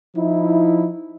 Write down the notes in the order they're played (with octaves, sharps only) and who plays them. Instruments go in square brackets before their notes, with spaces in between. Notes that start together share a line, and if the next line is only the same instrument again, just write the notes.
[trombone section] F3 D#4 E4